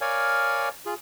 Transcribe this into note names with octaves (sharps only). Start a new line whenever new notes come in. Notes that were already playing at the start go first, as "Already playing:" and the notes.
A#4 C#5 D5 F5 G#5
F4 G#4